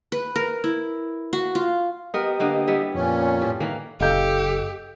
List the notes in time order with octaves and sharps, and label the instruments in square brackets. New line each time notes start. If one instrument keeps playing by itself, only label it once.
[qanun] B4
A#4
E4
F#4
F4
[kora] B3 A#4 [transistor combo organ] G4 D#5
[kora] D3 A#3 B3
G3 B3 E4
[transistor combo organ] F2 [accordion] A#2 C#4
[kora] A2 G3
[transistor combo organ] D#3 [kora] E3 A#3
[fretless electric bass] F#1 [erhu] G4 [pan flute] A4 [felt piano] D#5 F5 G6